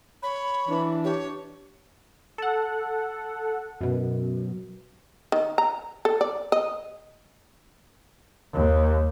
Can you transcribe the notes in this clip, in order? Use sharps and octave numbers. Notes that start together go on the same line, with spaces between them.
C#5 B5
E3 D4
G4 C#5
A4 F#5
F#2 B2
D#3
A#5
A4
D5
D#5
D#2